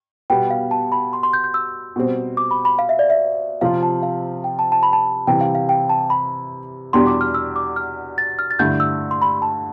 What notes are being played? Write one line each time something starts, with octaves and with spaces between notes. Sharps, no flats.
B2 G3 B3 G5
F5
A5
B5
C6
C6
G6
G6
E6
B2 G3 C4
D6
B5
B5
F5
E5
D5
E5
C3 F3 C4 F4 F5
A5
F5
G5
A5
A5
B5
A5
C3 E3 G3 G5
F5
F5
G5
A5
B5
E2 B2 G3 D4 G4 C6
D6
F6
E6
D6
F6
A6
F6
A6
G2 D3 A3 E4 G6
E6
C6
B5
A5